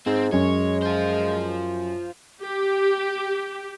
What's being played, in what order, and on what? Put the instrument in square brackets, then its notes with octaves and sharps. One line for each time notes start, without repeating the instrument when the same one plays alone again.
[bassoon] G#2 [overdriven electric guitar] C4
[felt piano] F#2 C#4 [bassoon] G#3 [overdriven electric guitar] C#5
[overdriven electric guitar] F4 C5
[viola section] G4